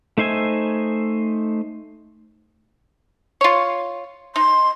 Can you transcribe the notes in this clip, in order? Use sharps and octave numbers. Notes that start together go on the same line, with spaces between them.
A3 D#4 C5 E5 G#5
F4 C#5
D#4 C6